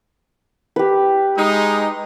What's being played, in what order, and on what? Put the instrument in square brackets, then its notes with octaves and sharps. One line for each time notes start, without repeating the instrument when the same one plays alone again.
[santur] G4 B4
[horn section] G#3 D#4